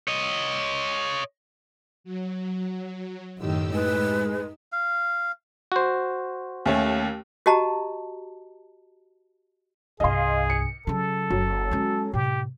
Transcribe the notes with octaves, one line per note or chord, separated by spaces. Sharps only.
C#5 D#5
F#3
F#2 A2 D#3 G4 E6
G#3 D#4 B4
F5
F#4 C5
D#2 A3 C#4
F#4 G4 D#5 A5 A#5
C2 G2 G#4 D#5 F5 C6
C#7
C#3 F#3 A4
F#1 F#3
G#3 C#4
A2 C3 G4